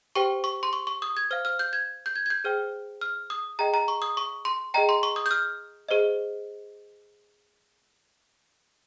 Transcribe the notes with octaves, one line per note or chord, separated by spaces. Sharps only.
G4 C5 G5 C#6
C#6
C6
C#6
C#6
D#6
G#6
C5 F5 F6
F6
G6
G#6
G6
G#6
G#6
G6
G#4 C5 G5 F6
F6
D#6
G#4 D#5 G5 A#5
A#5
C#6
D#6
C#6
C6
G#4 D#5 G5 A#5
C6
C#6
D#6
G6
F6
G#4 C5 D#5